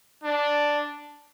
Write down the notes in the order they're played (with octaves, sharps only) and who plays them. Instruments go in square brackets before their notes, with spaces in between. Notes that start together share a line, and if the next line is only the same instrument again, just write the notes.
[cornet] D4